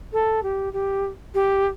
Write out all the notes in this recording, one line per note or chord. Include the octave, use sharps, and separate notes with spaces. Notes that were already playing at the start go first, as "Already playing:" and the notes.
A4
G4
G4
G4